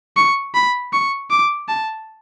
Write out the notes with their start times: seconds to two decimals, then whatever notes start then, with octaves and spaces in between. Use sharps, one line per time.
0.17 C#6
0.55 B5
0.93 C#6
1.31 D6
1.68 A5